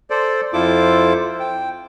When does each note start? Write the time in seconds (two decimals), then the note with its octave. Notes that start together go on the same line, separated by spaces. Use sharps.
0.10 A4 C5 D5
0.53 F2 E4 F4 A4 C5 D6
1.40 G5